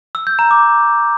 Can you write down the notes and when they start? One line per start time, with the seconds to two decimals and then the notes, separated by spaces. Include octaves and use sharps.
0.15 E6
0.27 G6
0.39 A#5
0.51 D6